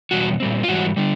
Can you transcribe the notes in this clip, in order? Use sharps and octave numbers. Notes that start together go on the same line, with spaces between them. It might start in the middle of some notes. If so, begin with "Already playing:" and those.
E2 B2 G3 B3 F#4
A#2 G3 C4
F4
G#2 E3 G3 F#4
D3 G3